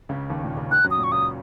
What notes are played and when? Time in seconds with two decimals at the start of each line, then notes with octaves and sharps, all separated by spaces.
0.09 C#2 C#3
0.30 D#2 D#3
0.44 A#2
0.57 C#2 C#3
0.71 D#2 D#3 F#6
0.84 F#2 F#3
0.91 D#6
0.98 A#2
1.04 C#6
1.12 C#2 C#3 D#6